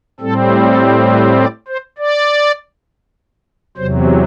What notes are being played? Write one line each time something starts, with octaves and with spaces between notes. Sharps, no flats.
A2 G3 C4 A4
A4
B4
D5
C5
D5
E2 C3 F#3 C5